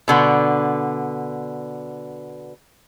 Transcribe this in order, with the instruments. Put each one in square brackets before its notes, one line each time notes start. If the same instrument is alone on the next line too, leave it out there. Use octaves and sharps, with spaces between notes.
[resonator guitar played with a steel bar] B2 D3 B3